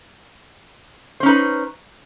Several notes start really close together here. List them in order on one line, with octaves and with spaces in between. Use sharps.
C5 C#4 D#4 B4